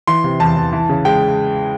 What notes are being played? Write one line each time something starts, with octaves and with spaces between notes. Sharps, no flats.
E3 C6
C3
E2 A5
E2
E3
C#3
G#3 G5